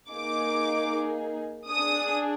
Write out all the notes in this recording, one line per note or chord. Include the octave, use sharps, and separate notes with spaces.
A#3 D#4 G#4 D6
D4 G#4 D#6